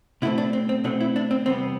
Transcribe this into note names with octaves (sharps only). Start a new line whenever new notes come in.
B2 A3 C4 E4
D4
C4
C4
B2 A3 C4 D4
E4
D4
C4
E2 C3 G3 B3 C4